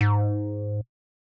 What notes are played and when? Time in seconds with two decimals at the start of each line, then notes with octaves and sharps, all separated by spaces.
0.01 G#2